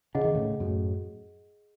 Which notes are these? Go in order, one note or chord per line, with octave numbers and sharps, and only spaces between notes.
C#3 G#4 D#5 F#5
D#3
A2 C#3
F#2 A2